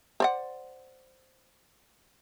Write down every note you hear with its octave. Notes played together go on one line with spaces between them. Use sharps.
C5 D5 F#5